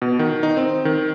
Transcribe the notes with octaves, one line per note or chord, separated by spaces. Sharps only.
B2
D#3
D#4
C4
D#3